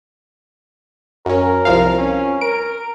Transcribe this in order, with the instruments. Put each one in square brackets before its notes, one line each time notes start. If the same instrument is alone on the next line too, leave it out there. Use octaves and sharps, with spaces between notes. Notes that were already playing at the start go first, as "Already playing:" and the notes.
[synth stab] F#2 C#4 [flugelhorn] A#4
[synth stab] C2 F3 F5
[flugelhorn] C#4
[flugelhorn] A#4 [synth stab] D7